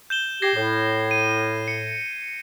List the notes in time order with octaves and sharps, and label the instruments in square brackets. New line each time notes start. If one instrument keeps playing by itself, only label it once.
[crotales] G6 E7 G7
[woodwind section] G4 [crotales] G#6 A#6 C7
[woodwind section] A2
[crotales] D#7
C#7